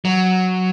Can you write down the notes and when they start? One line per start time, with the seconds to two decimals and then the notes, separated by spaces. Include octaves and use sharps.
0.05 F#3